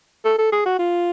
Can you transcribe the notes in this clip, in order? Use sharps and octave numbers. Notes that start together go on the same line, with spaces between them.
A4
A4
G#4
F#4
F4